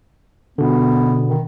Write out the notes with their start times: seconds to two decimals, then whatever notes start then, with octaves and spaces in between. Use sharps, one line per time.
0.58 B2 D3 B3
1.28 D#3